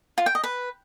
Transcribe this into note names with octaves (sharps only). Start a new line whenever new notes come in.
F4
G5
D#5
B4